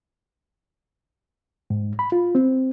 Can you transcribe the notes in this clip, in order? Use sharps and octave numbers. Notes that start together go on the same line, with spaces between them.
G#2
B5
F4
C4